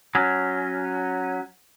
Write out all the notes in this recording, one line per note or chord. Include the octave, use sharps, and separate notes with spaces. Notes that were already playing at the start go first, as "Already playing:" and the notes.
F#3 C#4